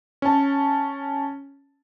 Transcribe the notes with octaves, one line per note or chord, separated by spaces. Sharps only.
C#4 A5